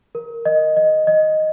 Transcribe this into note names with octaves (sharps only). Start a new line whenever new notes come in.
A#4
D#5
D#5
D#5